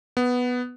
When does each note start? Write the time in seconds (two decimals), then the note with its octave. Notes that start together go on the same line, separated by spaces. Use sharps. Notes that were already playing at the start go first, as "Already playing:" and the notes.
0.17 B3